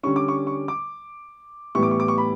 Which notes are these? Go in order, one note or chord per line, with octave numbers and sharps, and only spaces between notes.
D3 G3 C#4 C#6
D6
C#6
C#6
D6
A2 E3 G3 B3 C#6
D6
C#6
D6
C#6
B5